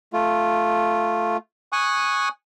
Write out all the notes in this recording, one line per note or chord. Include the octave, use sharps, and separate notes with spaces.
A3 F4
G#5 C#6 D#6 F#6